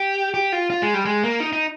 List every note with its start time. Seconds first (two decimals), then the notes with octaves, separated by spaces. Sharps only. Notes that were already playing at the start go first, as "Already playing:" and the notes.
Already playing: G4
0.34 G4
0.52 F4
0.70 F4
0.82 G#3
0.94 G3
1.05 G#3
1.24 A#3
1.40 D#4
1.53 D#4